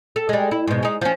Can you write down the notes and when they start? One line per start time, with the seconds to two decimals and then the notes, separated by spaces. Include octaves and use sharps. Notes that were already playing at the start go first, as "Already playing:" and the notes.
0.16 A4
0.29 G3 G#3
0.51 E4
0.67 G#2 B2
0.83 G#3 D#4
1.01 F3 C#4